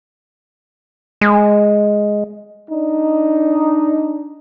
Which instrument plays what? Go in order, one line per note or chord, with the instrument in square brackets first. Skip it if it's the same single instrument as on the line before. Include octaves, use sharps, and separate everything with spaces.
[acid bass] G#3
[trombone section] D4 D#4